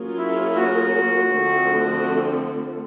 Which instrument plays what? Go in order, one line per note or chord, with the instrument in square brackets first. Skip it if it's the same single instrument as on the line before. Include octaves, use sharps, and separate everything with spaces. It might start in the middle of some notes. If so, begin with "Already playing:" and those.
Already playing: [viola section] F#3 A#3 C#4 F4 G#4
[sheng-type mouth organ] E4
F#4
[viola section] D3 F3 A3 C4